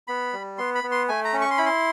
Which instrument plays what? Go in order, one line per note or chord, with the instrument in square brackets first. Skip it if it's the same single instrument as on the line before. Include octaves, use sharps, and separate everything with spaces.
[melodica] B3 B5
G3
B3 C6
B5
B3
C6
A3 G#5
A#5
C#4
C#6
C6
E4 B5
C6